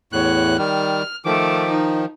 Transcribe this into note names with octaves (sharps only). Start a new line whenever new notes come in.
E2 A2 C#5 F#6
D#3 G3 F6
D#3 F3 A3 D6
D#4